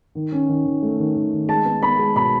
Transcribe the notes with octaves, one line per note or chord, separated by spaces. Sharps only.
D#3
C#4
D#3
D#3
A3
D#3
D#3
D#3
G#3 A5
B3
B3 B5
G#3
B2 B5